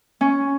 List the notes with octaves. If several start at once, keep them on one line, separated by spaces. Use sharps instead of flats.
C#4